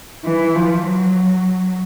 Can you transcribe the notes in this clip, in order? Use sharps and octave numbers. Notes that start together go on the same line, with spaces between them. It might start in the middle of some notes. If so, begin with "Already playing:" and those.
E3
F3
F#3